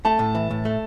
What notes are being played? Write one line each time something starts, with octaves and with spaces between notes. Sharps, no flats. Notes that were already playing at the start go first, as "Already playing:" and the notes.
A3 A5
A2
E3
A2
A3